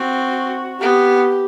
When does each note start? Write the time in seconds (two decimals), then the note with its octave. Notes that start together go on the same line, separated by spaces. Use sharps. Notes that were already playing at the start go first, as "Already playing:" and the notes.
Already playing: C4 F#4
0.80 B3 G4